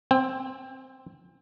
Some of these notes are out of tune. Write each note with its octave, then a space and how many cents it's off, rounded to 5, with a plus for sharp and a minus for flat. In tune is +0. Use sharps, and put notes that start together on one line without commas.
C4 +0 G5 +35